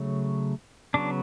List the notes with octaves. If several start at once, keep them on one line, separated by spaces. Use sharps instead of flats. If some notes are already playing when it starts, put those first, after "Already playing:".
Already playing: C#3 F#3 A3
C#3 F#3 B3 D4